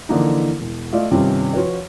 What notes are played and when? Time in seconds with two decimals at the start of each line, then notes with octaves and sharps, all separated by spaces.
0.09 D3 E3 F3 A#3 D#4
0.60 E1
0.93 A3 F4 D5 D#5 F5
1.11 G2 C3 D#3 G3 C#4 F4
1.53 F3 F4 F#4 B4 C#5